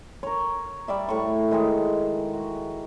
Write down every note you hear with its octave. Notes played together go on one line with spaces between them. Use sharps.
A#4 C#5
G3 D5 E5
A2 C#6
D#3 G#3 E5
F#4